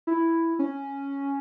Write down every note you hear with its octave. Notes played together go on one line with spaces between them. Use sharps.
E4
C#4